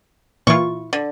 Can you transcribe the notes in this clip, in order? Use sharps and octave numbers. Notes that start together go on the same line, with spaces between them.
A#2 E3 E4 F4 C#6
D3